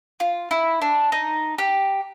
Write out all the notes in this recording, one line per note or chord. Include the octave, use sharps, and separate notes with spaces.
F4
E4
D4
D#4
G4